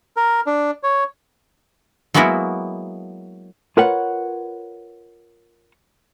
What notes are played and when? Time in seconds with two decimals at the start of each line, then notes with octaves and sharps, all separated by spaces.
0.17 A#4
0.46 D4
0.83 C#5
2.14 F#3 G#3 A#3 B3 E4 F#4
3.77 F4 A#4 B4 C#5 F#5